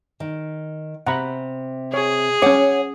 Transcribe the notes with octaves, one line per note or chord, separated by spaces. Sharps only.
D#3
C3 F#5 A#5 B5
G#4 C#5
C#4 C#5 F#5 D6